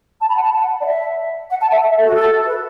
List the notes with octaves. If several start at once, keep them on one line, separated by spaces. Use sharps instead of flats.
A5
B5
F#5
A5
F#5
D5
E5
F#5
A5
E5
E5
A4
F#4
A4
B4